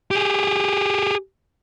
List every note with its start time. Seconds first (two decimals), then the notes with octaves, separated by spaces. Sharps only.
0.11 G4 G#4